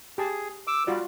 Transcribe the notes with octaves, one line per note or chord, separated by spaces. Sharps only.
G4 G#4 A5
D6 E6
G3 F4 F#4 D5